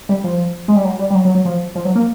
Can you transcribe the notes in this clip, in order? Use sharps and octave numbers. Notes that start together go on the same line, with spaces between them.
G3
F3
G#3
G3
F#3
G3
G3
F#3
F#3
F#3
F3
F3
F#3
A#3